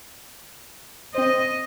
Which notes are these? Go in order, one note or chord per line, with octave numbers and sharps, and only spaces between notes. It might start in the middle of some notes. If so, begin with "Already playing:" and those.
C4 C5 D#5